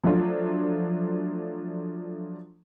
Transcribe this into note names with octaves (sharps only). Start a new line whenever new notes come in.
F3 F#3 A3 D4 F4